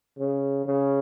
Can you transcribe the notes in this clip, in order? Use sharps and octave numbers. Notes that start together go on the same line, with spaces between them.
C#3
C#3